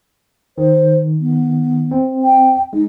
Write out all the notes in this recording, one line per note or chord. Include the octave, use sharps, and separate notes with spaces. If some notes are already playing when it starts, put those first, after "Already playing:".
D#3 C5
B3
C4
G5
G#3 D#4